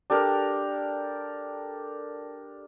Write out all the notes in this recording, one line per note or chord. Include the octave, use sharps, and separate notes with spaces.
D4 G4 A4 A#4